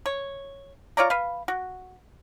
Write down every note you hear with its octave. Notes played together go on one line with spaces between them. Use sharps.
C#5
F4 C#5 D5 A#5
B4 F5
F#4